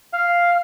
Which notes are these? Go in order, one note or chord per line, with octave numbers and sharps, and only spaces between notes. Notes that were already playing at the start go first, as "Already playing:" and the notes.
F5